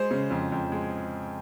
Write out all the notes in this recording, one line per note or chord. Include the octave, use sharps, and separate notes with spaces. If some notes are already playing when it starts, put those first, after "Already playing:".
Already playing: G#3 C5
C#3
F2
F2
G#3